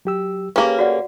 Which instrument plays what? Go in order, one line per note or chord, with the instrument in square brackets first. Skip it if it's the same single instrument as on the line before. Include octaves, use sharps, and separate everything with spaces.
[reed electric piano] F#3 G4 E6
[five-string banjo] A#3 C#4 [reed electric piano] G4 G#4 B4
[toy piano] F#4 D5 F#5